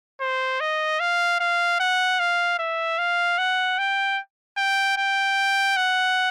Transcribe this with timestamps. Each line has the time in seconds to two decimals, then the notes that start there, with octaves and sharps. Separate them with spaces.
0.21 C5
0.61 D#5
1.00 F5
1.40 F5
1.80 F#5
2.19 F5
2.59 E5
2.98 F5
3.38 F#5
3.79 G5
4.58 G5
4.97 G5
5.77 F#5